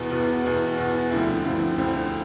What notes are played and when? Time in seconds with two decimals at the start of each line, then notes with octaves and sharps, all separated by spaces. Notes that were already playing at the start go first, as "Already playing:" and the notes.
Already playing: E2 B2 B3
0.10 E2 B2 B3
0.44 E2 B2 B3
0.77 E2 B2 B3
1.11 D2 D3 F3 C4 E4
1.44 D2 D3 F3 C4 E4
1.78 D2 D3 F3 C4 E4